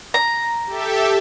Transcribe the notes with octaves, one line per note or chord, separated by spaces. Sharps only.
A#5
G4 A4 E5